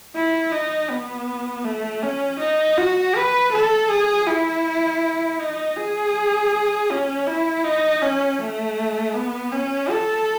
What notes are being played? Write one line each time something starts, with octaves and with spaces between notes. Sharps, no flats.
E4
D#4
B3
A3
C#4
D#4
F#4
B4
A4
G#4
E4
D#4
G#4
C#4
E4
D#4
C#4
A3
B3
C#4
A4